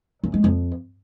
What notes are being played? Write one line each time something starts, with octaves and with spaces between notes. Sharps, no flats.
F#2
G#3
F2